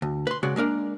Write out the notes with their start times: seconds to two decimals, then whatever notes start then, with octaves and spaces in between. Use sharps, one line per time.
0.02 D2
0.27 B4 C6
0.43 C#3 G#3 F#4 D5
0.56 G#3 A#3 D4 A#4